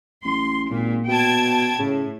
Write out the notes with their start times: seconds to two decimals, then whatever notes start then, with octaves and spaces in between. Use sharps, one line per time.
0.25 A1 C6
0.70 G#1 A#2
1.08 B2 G5 A5 G#6
1.79 A2 C#3